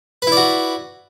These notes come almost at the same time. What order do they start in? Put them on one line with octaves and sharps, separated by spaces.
B4 E4 D5 F#4